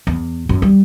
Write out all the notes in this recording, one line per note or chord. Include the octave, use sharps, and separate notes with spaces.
E2
F#2
G3